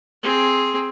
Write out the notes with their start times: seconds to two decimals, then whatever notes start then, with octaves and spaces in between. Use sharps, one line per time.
0.23 C4 G#4